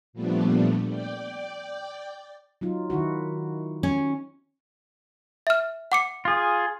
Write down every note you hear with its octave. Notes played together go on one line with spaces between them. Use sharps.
A#2 F3 G3 A3 B3 D4
D5 G5
F#3 D#4 F4
D#3 E4 F#4
C#4
E5 F6
F#5 D6 C#7
F4 G#4